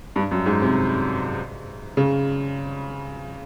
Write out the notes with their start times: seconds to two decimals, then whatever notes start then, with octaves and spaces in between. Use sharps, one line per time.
0.16 G2
0.31 F#2
0.46 G#2
0.62 C3
1.97 C#3